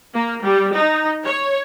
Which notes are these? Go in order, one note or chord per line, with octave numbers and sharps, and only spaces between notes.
A#3
G3
D#4
C#5